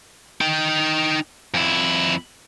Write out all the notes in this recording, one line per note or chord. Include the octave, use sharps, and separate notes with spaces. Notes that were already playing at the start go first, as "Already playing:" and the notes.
D#4 G5
F2 E4